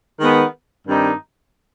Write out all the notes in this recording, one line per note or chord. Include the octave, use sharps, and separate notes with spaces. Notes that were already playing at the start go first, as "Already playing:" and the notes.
D#3 G#3 B3
G2 D#3 G3 C4 D#4